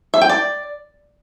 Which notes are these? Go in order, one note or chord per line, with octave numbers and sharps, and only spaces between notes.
E5
G5
D5